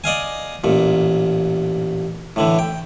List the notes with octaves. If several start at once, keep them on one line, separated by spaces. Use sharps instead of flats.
D5 D#5 F5 G#5
A1 A#2
A2 D3 E3
G5